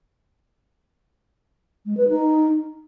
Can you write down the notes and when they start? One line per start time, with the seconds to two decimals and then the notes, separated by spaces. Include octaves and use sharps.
1.86 G#3
1.97 B4
2.09 D#4